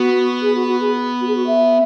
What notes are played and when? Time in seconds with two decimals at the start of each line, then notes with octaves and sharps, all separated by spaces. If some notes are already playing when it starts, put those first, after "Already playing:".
Already playing: B3 F#4
0.41 G#4
0.54 F#4
0.67 F#4
0.80 G#4
1.20 F#4
1.27 G#4
1.34 F#4
1.46 E5